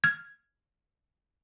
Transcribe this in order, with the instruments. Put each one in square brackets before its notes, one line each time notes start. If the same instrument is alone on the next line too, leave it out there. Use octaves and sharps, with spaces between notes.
[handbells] F6 G#6